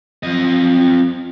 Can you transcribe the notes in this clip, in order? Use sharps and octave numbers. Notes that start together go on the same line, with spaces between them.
F2 D#5